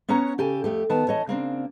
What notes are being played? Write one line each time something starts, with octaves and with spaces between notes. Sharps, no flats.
B3 C#4 C#5 F#5 A#5
C#3 G4 A4 G#5
F2 A3 G4
D#3 B3 A5
E3 C#5 D#5 A5
C#3 A#3 C4 D4